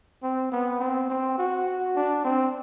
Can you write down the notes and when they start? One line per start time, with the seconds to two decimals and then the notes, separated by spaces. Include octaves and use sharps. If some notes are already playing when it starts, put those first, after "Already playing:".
0.23 C4
0.52 B3
0.80 C4
1.10 C4
1.38 F#4
1.96 D4
2.25 C4